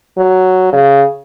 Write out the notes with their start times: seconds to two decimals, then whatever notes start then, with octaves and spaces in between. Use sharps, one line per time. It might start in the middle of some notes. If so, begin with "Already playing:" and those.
0.18 F#3
0.73 C#3